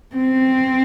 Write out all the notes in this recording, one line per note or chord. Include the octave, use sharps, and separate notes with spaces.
C4